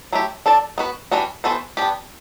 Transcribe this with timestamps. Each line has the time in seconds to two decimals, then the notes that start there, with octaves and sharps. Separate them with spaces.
0.13 F#3 A3 E4 G4
0.46 D4 A4 D5
0.78 B3 F#4 B4
1.12 E3 G3 D4 F#4
1.44 E3 B3 F#4 A4 C5
1.77 B3 D4 G4